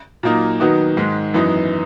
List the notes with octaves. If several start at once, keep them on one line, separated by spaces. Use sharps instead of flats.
A#2 F#3 A#3 D#4
D#3 F#3 B3 D#4 F#4
G#2 D#3 G#3
F#2 E3 B3 D#4